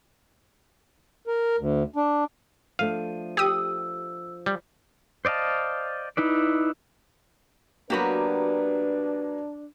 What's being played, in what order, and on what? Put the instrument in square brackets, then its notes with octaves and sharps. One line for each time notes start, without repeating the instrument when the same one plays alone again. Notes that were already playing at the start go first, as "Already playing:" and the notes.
[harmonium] A#4
D2
D4
[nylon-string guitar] F3 A3 D4 [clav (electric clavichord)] F5 [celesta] D#7
[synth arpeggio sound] G4 D#6 [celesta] E6
[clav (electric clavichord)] G3
[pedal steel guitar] C5 D5 D#5 F5 A5
D#4 E4 B4 D5
[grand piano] F#3 A#3 [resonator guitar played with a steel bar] B3 F#4 G4 [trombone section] D4 [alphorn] B4